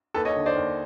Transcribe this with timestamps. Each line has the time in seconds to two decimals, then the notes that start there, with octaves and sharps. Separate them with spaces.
0.14 D#2 A4 B4
0.25 C#5 D#5
0.36 D3
0.46 C5 D5
0.56 D#2